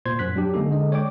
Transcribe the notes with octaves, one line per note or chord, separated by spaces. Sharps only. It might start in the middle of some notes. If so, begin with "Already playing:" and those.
A#2 C5 C6 G#6
F#2 F#6 B6
F#3 D4 G4
D3 G#3 A#3 C#4 D#4 A4
D3 G#3 D#5
C#5 D5 G5 D6